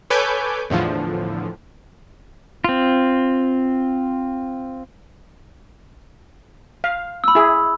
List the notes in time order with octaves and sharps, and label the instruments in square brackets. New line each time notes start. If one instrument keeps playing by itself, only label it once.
[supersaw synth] A4 B4 C#5 G#5 D6 G6
E2 A2 D3 F3
[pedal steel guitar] C4 F4
[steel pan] F5
[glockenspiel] B5 E6
[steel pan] E4 G#4